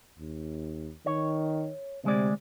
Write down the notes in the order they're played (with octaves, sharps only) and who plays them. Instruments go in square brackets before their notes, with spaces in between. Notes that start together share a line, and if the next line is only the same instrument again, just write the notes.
[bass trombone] D#2
[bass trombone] D#3 [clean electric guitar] C#5
[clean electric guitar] D2 G#3 D5 [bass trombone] C3